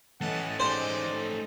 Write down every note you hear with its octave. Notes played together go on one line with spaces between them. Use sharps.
E3 A3 C#4 D#5 F#5 A5
G#3 D#4 G4 C5 D5